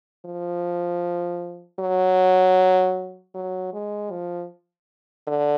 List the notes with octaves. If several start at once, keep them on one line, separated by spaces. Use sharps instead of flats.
F3
F#3
F#3
G#3
F3
D3